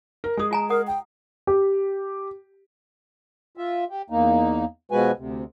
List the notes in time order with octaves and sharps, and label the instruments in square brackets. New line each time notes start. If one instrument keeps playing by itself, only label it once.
[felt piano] A#4
[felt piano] G#3 G#4 [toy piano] G#5 D#6
[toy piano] F4 G#5 A#5
[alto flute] A#4 [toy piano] F#5 D#6
[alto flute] G5
[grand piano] G4
[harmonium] F4 E5
G4
E2 A#3 D#4
B2 F3 G#3 F#4 B4 G#5
D2 C3